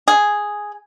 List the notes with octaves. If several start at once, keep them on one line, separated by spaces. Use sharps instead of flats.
G#4